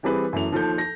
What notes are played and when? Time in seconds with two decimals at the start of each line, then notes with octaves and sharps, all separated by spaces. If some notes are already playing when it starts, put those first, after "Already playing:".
0.03 E3 G3 C4 G#4 B4
0.33 F#2 E3 A3 F7
0.52 D#2 F3 A4 G6
0.78 A4 A#6